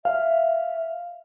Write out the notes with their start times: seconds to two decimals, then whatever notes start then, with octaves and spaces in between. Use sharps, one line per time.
0.05 E5 F5